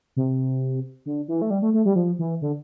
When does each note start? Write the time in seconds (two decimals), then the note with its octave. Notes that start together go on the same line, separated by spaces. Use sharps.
0.17 C3
1.06 D3
1.28 E3
1.42 A3
1.50 G3
1.62 A3
1.74 A3
1.85 G3
1.96 F3
2.19 E3
2.42 D3